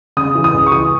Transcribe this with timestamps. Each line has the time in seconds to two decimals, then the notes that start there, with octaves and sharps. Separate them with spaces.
0.17 C#3 D#6
0.35 E3
0.44 D#6
0.53 C#2
0.67 C#6
0.72 E3 D#6